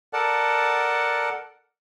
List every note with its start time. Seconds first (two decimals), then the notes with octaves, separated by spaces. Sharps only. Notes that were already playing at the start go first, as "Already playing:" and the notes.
0.13 A4 A#4 D5 F#5 A5